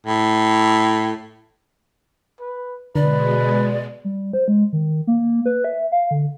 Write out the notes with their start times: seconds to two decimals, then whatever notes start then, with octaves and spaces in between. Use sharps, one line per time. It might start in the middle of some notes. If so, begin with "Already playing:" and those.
0.06 A2
2.40 B4
2.95 B2 D3 G#3 B4 D5
4.05 G3
4.33 C5
4.48 G#3
4.73 D#3
5.07 A#3
5.46 B4
5.64 E5
5.92 F5
6.11 D3